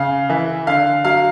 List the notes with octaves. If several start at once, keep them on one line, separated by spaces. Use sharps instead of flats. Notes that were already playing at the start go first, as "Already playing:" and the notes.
Already playing: C#3 F5
E3 E5
D3 F5
F#3 F5